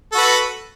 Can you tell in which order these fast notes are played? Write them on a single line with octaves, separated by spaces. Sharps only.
A4 F#4 B4